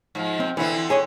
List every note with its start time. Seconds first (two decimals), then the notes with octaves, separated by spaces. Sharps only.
0.15 G#2 F3
0.40 C4
0.57 D3 E3 B3 C4 E4
0.90 G#4 C#5 D#5